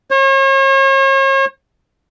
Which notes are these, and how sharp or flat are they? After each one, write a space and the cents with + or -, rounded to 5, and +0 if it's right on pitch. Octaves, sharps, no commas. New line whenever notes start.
C#5 -40